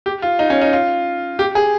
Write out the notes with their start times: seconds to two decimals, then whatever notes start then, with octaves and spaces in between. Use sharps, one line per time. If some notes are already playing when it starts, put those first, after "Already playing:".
0.06 G4
0.22 F4
0.39 D#4
0.50 C#4
0.62 D#4
0.73 F4
1.39 G4
1.55 G#4